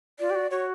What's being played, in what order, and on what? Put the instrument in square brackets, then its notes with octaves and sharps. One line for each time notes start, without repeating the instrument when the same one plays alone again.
[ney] F4 [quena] D5
[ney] G4
F#4
[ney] F#4 [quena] C#5